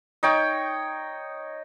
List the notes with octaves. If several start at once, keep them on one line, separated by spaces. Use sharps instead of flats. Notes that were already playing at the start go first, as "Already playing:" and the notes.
D#4 C#5 G5